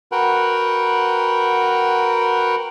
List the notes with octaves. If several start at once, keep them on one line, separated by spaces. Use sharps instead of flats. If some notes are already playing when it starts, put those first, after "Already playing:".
F#4 A#4 B4 F#5 G5